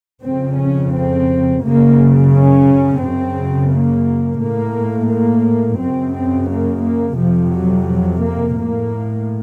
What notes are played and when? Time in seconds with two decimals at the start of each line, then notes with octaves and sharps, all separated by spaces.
0.24 F2 C#3 C4
0.60 C#4
0.93 C4
1.63 F#2 C#3 A#3
2.33 C#4
3.01 F#2 C#3 C4
3.72 A#3
4.41 A2 A#3
5.11 A#3
5.80 F#2 C#3 C4
6.15 C4
6.50 A#3
6.84 A#3
7.19 F2 C3 F3
7.54 F#3
7.88 F#3
8.23 A#3
8.58 A2 A#3